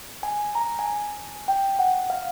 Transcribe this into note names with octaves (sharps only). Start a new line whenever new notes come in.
G#5
A#5
G#5
A5
G5
F#5
F5